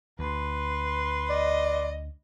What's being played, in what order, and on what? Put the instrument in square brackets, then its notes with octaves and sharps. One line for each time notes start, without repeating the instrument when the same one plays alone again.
[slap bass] D2 [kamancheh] B4 C6
[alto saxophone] D5 [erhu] D#5